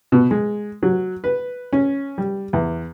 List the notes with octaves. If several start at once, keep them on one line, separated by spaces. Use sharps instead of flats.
B2
G#3
F#3
B4
C#4
G3
E2